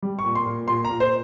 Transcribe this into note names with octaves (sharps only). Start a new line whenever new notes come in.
G3
C#6
A#2
C6
A#2
A#2 C6
A#2 A#5
C5